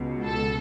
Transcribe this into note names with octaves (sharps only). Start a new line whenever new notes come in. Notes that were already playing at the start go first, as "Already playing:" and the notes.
Already playing: C#2 B2
A4